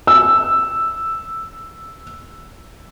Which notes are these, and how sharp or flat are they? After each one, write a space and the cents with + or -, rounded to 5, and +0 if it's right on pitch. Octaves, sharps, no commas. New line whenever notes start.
E6 +0